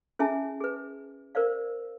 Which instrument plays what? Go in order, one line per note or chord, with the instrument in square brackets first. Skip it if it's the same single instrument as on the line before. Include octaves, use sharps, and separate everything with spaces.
[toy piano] C#4 E4 G#4 E5 G#5 A5
G#4 B4
A#4 C5 D5 F5